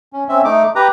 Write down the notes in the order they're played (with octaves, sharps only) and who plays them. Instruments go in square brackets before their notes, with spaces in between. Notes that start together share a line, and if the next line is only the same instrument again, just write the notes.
[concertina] C#4
C4 C#4 E5
A3 D#4 D6
G4 B4 A#5